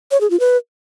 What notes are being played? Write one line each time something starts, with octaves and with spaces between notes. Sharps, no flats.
C#5
G#4
F4
B4